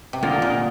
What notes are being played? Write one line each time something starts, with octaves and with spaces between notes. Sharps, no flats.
C3
D3 A#3 F4 A#4 D#5
A#2